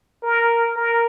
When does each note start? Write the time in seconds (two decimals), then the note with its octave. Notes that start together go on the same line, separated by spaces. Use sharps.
0.23 A#4
0.77 A#4